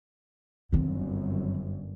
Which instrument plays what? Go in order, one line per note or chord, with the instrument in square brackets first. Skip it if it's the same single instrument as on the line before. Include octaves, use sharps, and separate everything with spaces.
[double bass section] G1 F#2 [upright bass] D#3 C4